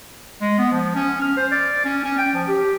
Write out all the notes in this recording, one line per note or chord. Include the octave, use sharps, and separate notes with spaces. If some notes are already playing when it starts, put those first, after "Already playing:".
G#3
B3
F3
C#4
F6
C5
D5
C#4
C#4
G5
F3
G4